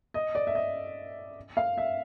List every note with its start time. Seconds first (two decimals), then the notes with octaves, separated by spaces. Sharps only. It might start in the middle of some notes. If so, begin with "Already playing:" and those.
0.14 D#5
0.35 D5
0.47 E5
0.55 D#5
1.57 F5
1.78 E5